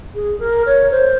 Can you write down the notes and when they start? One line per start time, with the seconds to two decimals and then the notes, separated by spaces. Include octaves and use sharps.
0.15 G#4
0.40 A#4
0.66 C#5
0.91 C5